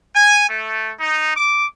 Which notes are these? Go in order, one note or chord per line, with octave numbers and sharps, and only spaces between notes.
G#5
A3
D#4
D6